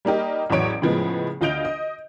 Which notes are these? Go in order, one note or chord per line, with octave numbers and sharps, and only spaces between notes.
G3 A#3 D#4 G4
A1 E2 F#3 C#5 D7
A2 C#3 F3 G#3 B3
D2 F4 D#5 G6 D7 F7
D#5